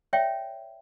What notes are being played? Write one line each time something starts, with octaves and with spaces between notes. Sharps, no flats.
C#5 D5 E5 G5